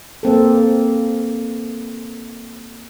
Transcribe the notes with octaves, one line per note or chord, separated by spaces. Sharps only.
A#3 C4 A4